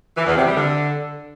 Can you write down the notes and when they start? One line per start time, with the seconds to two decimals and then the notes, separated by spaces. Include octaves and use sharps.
0.17 E3
0.27 E2
0.36 C3
0.46 G3
0.56 D3